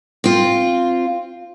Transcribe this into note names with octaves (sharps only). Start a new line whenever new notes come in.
C4 F4